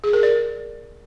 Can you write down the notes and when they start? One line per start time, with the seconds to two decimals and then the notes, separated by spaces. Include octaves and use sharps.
0.04 G#4
0.13 A#4
0.23 D5